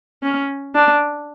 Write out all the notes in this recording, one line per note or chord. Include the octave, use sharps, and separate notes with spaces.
C#4
D4